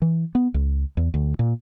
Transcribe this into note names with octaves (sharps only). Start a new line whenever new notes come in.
E3
B3
C#2
E2
D2
A#2